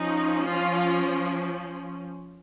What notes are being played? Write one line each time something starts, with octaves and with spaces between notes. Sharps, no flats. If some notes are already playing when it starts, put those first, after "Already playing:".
Already playing: F3 C#4 D#4
F4